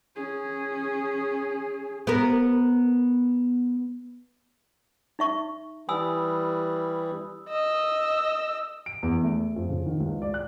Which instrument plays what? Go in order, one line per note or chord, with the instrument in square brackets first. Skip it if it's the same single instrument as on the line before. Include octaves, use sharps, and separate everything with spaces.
[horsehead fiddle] C#4 G#4
[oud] B3 A#4
[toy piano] D#4 E5 C#6
[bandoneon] E3 G3 [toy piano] G#5 [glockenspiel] B5 D#6 E6
[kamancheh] D#5 E6
[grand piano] D7
E2
A3
F2
C#3
D#3
C#2
D5
F#6